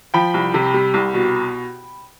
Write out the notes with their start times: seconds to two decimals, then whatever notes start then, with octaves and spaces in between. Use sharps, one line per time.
0.14 F3 G5 B5
0.34 C2
0.54 C3
0.74 G3
0.94 C2
1.14 B2